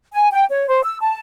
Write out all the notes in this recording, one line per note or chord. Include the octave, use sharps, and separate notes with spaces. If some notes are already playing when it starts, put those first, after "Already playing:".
G#5
G5
C#5
C5
E6
A5